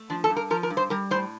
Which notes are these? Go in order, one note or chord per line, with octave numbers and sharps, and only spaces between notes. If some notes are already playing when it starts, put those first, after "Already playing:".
Already playing: A3
F3 D4
A4
G2
A#4
F3 A#4
A#4
G2
C5
G3 A#4
A2 C5